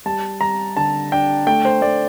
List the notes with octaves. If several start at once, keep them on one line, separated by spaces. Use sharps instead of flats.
G3 A5
G3 A#5
D3 A5
D4 G5
A3 G5
C5
A3 D5